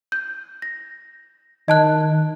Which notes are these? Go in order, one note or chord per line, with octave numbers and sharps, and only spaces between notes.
G6
A#6
D#3 D#5 A5 F#6